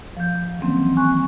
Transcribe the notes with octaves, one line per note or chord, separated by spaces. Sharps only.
F3 G6
D#3 E3 F#3 A#3 C4 C#4
G#5 C6 C#6 F#6